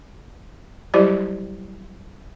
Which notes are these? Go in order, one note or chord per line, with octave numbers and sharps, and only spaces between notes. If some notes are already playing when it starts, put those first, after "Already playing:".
F#3 G3 E4 G4 C5 D5